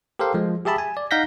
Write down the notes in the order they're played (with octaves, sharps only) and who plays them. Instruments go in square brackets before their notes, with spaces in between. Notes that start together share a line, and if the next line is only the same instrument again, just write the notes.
[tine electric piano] G4 A4 A#4 C5 F5
F3 G#3
G4 G#4 E5 A5 B5
G#5
D5
D#4 F5 F#5 G6 A#6 B6